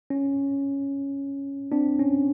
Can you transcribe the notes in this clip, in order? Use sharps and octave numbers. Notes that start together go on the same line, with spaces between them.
C#4
C4 D4
C#4